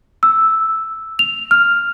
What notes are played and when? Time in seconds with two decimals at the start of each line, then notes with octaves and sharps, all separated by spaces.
0.23 E6
1.19 F7
1.51 F6